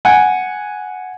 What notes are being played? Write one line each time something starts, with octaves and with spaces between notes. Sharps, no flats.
F#5 G#5